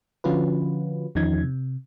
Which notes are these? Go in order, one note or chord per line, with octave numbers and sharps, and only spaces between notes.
D3 F3 C#4 F4 F#4 B4
E2 D#3 F3 C#4 D#4 G#6
C3